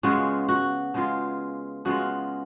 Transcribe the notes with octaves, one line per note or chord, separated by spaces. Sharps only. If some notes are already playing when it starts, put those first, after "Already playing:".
C#3 G#3 B3 F4 F#4
F#4
C#3 G#3 B3 F4
C#3 G#3 B3 F4 F#4